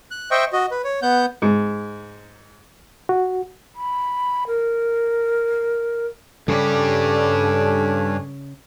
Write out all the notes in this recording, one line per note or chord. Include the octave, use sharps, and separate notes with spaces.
F#6
C5 D#5 E5 G5 C#6
F#4 D#5
B4
C#5
B3 F#5 G6
G#2
F#4
B5
A#4
G2 C#3 G3 C#4 D4 G4 A4 C#5